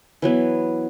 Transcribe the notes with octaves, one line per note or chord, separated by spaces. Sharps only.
E3 F#3 B3